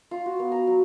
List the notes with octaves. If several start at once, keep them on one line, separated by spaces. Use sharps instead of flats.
F4
F#4
B3
A#5
F#3